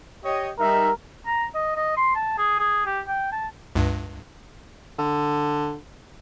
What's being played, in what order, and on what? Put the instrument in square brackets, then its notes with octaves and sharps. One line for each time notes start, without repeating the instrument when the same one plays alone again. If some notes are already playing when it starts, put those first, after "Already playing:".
[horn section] G4 C#5 D#5
[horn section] G3 D#4 E5 [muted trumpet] A#4
[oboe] A#5
D#5
D#5
C6
A5
G#4
G#4
G4
G5
A5
[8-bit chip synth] C#2 G2
[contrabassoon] D3